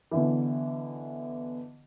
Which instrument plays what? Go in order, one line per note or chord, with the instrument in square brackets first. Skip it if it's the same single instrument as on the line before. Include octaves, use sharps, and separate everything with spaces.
[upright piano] B2 D3 E3